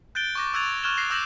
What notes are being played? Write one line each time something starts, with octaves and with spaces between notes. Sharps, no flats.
F#6 G6 A6 D7 G7
C#6 D6 A#6
C#6 E6 F#6 G#6 A6 F7
C#6 F6 F#6 G#6 E7 G7
F#6 A#6 C7
D6 E6 G6 A#6 E7 F#7